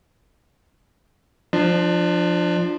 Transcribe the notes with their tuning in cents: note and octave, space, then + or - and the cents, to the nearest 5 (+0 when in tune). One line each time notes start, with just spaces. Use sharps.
F3 +0 D4 +25